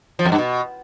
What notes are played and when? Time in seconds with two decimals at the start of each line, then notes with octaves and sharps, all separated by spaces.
0.19 F3
0.25 F2
0.32 G2
0.38 B2